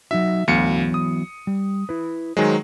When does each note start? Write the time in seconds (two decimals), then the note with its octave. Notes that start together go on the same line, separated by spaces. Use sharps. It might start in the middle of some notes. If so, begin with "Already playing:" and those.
0.11 F#3 D#4 F#4 E5
0.48 D2 E3 F#3 B3 F5 C#7
0.94 D#6
1.47 G3
1.89 E4 B4
2.37 D#3 F#3 G#3 C5 G#5